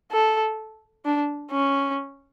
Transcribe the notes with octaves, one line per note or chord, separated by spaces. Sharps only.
A4
D4
C#4